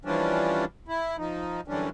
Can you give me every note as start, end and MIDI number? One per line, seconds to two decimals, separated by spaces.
0.05 0.65 52
0.05 0.65 53
0.05 0.65 55
0.05 0.65 61
0.05 0.65 62
0.88 1.16 64
1.18 1.61 53
1.18 1.61 63
1.68 1.89 42
1.68 1.89 50
1.68 1.89 52
1.68 1.89 55
1.68 1.89 61
1.68 1.89 62